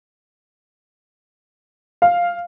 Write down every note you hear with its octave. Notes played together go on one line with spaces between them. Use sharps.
F5